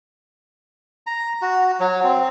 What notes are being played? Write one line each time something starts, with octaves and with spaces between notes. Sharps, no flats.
A#5
F#4
F#3
C4